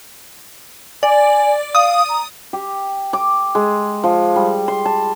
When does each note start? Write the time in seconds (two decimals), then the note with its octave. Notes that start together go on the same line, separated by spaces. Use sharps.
1.03 D5 G#5
1.75 F5 D#6
2.09 A#5
2.53 G4
3.13 D6
3.55 G#3
4.04 F3
4.36 G3
4.68 C6
4.85 A5